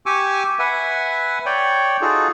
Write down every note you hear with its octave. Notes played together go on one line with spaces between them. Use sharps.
G4 G#5 C#6 D6 E6
B4 E5 F#5 G#5
C#5 D5 G5
D#4 F4 F#4 G#4 A4